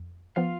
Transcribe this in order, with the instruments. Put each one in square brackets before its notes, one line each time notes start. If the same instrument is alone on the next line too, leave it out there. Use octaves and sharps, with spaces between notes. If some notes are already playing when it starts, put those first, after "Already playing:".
Already playing: [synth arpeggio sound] F2
[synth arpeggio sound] F3 B3 [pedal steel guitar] F4 F5